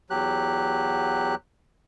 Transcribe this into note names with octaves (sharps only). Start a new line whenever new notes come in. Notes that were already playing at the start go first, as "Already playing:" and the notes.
E2 F#3 G4 F#6